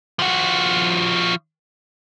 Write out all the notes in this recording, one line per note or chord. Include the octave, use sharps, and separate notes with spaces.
F3 F#4